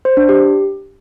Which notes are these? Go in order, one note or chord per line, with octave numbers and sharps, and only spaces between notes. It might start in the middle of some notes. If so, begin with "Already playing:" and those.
C5
D4
G4